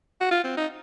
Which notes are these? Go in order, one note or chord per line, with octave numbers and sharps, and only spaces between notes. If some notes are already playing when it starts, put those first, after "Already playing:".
F#4
F4
C4
D#4